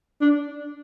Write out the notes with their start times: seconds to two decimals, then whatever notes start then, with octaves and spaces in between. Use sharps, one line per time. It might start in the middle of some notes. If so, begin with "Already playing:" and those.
0.21 D4